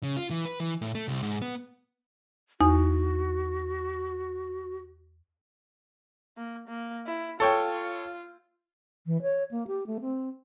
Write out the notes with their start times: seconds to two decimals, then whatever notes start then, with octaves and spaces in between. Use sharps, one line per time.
0.03 C#3
0.16 F4
0.30 E3
0.45 B4
0.60 E3
0.82 A2
0.95 A3
1.08 C2
1.23 G#2
1.42 B3
2.61 E2 D#4 F#4
6.37 A#3
6.68 A#3
7.06 E4
7.40 F4 A4 C#5 G5
9.06 E3
9.22 C#5
9.51 A#3
9.67 G4
9.87 A3
10.01 C4